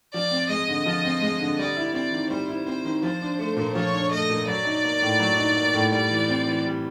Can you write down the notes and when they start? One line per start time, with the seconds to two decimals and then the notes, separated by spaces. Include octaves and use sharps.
0.13 F3 D5
0.31 C4
0.49 G#3 D#5
0.68 D3
0.86 F3
1.05 C4
1.21 G#3
1.40 D3
1.58 G3 D5
1.77 E4
1.94 C4 D5
2.12 D#3
2.30 G3 C5
2.48 E4
2.66 C4 C5
2.84 D#3
3.02 F3 C5
3.22 D4
3.39 A3
3.57 A#2
3.75 F3 C#5
3.93 D4
4.11 A3 D#5
4.30 A#2
4.47 F#3 D5
4.65 D#4
4.84 A#3
5.02 A2
5.20 F#3
5.37 D#4
5.56 A#3
5.74 A2
5.92 G3 D5
6.11 E3
6.28 C4
6.47 E3
6.65 G3